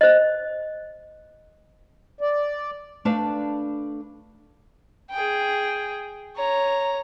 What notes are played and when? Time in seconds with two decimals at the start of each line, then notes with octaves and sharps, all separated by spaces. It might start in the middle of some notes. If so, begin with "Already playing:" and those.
0.01 C5 D#5
2.21 D5
3.05 A3 D4 B4 D5 F5 A5
5.11 G#4 G5
6.36 C#5 A#5